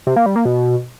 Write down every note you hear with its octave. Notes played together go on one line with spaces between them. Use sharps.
C3
A#3
G3
A#3
B2